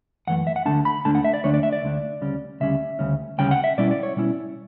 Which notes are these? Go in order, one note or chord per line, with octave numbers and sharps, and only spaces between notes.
F#2 E3 A3 F#5
E5
F#5
D2 D3 A3 D4 A5
B5
D2 D3 A3 D4 A5
F#5
E5
D5
D2 D3 A3 D4 C#5
D5
E5
D5
D2 D3 A3 D4
D2 C#3 G3 C#4
D2 C#3 G3 C#4 E5
D2 C#3 G3 C#4
D2 C#3 G3 C#4 G5
F#5
E5
B2 G3 C#4 E4 D5
D5
C#5
B2 G3 C#4 E4